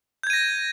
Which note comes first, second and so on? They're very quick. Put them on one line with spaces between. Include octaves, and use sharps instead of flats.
G6 G#6 D#7 A#6